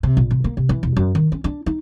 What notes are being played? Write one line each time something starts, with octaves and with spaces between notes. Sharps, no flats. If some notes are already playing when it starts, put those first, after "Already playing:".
C3
A#1
C3
A#3
C3
E3
E1
F#2
D#3
C#4
D4
D#4